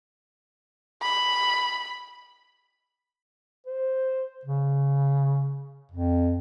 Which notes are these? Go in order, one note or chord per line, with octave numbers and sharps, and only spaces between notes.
B5
C5
C#3
F2